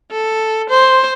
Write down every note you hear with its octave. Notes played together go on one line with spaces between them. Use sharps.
A4
C5